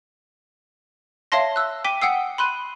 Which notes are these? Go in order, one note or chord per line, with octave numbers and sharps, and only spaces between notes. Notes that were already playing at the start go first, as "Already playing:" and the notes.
C#5 E5 F5 A5 C6 A#6
E6 F#6
G5 D6 B6 D#7 G7
F#5 G5 D#6 E6 C7
B5 C6 F#6 D#7